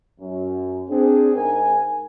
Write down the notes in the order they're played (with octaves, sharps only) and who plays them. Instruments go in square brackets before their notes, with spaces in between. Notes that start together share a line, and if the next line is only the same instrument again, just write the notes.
[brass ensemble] F#2
C4 D4 G#4
G#2 A#4 G#5